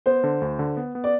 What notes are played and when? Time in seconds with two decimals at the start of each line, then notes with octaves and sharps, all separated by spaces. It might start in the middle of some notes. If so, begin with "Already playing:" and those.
0.06 B3 C5
0.24 D3
0.42 D2
0.59 D3
0.77 B3
0.95 B3
1.04 D5